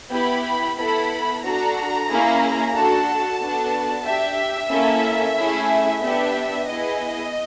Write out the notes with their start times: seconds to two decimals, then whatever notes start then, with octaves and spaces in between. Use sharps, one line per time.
0.12 B3 E4 G4 B5
0.78 B3 E4 A4 B5
1.43 D4 F#4 A4 A#5
2.09 A#3 C#4 E4 G#4
2.74 D4 F#4 A4 A5
3.40 B3 D4 F#4 A4
4.05 D4 G4 E5
4.71 A#3 C#4 E4 A4
5.36 A3 C#4 E4 G#4
6.02 B3 D4 G4 E5
6.67 B3 E4 G#4 D#5